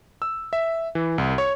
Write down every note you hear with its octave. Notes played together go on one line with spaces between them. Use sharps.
E6
E5
E3
C2
C#5